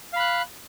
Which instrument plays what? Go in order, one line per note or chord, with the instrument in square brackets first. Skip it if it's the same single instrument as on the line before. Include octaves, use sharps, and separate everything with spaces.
[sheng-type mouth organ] F5
B5
F#6